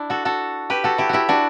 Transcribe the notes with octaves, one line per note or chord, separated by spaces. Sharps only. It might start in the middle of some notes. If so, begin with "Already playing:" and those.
Already playing: D4 E4
F#4 A4
F#4 A4
G4 B4
F#4 A4
E4 G4
E4 F#4 G4
D4 F#4